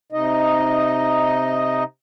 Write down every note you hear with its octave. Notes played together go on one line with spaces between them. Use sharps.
C3 D#4 D#5